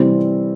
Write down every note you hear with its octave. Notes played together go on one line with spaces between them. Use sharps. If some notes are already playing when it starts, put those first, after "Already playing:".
Already playing: C3 E3 G3 C4